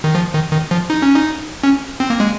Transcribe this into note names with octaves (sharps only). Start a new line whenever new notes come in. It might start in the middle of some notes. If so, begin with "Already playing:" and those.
D#3
F3
D#3
D#3
F3
D#4
C#4
D#4
C#4
C4
A#3
G#3